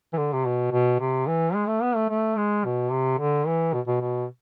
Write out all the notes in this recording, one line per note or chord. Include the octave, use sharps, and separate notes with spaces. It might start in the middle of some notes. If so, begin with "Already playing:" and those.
E3
D3
C3
B2
B2
C3
E3
G#3
A3
B3
A3
A3
G#3
B2
C3
D3
E3
B2
B2
B2